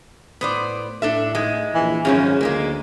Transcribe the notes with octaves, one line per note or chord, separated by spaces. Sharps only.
A2 B3 C5 D5
A2 D4 A4 E5
G#2 G#3
A#1 E3
G#1 F#2 C#3 F3 C#4
D2 A#2 G#3 A#3